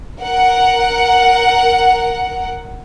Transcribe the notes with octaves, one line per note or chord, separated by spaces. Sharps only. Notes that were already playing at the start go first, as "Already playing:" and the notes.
A#4 F#5